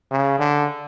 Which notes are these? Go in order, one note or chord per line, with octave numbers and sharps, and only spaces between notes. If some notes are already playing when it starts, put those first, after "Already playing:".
C#3
D3